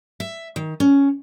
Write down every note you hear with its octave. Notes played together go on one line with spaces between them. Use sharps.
E5
D#3
C#4